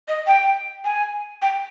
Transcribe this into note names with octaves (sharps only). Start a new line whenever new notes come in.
D#5
G5
G#5
G5